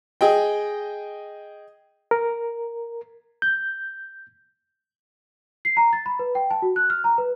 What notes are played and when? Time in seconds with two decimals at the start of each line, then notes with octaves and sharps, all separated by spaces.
0.21 G#4 D#5 G5
2.11 A#4
3.42 G6
5.65 C7
5.77 A#5
5.93 A6
6.06 B5
6.19 B4
6.35 G5
6.51 A5
6.62 F#4
6.76 F#6
6.90 F6
7.04 A#5
7.18 B4